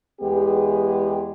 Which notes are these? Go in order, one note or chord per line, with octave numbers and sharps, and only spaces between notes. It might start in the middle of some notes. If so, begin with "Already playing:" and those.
E2 G#3 B3 G4 G#4